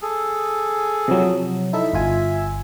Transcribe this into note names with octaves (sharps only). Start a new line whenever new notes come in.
G#4 A4
C3 F3 F#3
D#4 E4 A4 E5
G1 F4 G#5